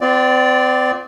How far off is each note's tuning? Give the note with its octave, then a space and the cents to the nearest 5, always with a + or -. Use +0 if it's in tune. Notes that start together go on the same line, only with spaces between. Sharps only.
C4 -35 F4 +0 D5 +0